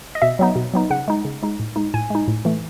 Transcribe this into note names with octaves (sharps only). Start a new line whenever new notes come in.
D#5
B2 E5
F#3 B3 D#4
B2
F#3 B3 D#4
C#3 F#5
G#3 D#4
C#3
G#3 D#4
A2
G#3 D#4
A2 G#5
G#3 D#4
A2
E3 A3